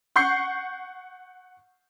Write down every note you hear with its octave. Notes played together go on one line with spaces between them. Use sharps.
F#5 C#6 G6 C7